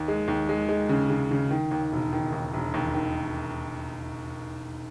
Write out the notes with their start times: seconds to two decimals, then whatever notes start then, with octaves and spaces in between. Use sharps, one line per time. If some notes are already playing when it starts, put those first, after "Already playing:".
Already playing: D#2
0.08 G#3
0.28 D#2
0.49 G#3
0.69 G#3
0.89 C#3
1.10 C#3
1.31 C#3
1.51 D#3
1.71 D#2
1.92 E1
2.13 D#3
2.32 D#2
2.53 E1
2.74 D#2
2.94 D#3